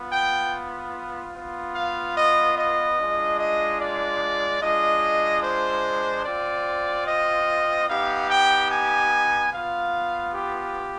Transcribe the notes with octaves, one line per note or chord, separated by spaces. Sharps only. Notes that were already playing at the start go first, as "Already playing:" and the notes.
Already playing: B3 F4
G5
B3 F4
F5
D#5
D#5
G#3 D4 F4
D#5
D5
G#3 D4 F4 D#5
C5
C4 F4 D5
D#5
B3 D#4 G4 F5
G5
G#5
B3 F4 F5
G4